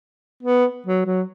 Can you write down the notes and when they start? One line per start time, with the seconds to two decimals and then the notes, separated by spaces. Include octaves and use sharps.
0.43 B3
0.87 F#3
1.05 F#3